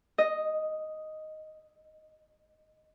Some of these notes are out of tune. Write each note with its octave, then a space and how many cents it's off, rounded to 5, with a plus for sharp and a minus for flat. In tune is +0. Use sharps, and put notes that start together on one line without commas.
D#5 +0